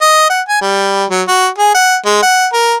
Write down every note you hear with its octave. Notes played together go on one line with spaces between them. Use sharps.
D#5
F#5
G#5
G3
F#3
F#4
G#4
F#5
G#3
F#5
A#4